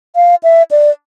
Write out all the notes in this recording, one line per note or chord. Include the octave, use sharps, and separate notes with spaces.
F5
E5
D5